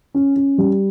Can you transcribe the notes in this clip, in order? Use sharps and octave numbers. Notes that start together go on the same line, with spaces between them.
C#4
C#4
G3